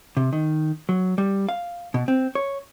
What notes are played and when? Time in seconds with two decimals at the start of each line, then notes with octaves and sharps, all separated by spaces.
0.17 C3
0.33 D#3
0.89 F#3
1.18 G3
1.49 F5
1.94 B2
2.08 C4
2.35 C#5